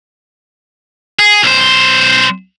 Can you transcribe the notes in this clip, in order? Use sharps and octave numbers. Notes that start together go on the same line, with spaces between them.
G#4
B1 C5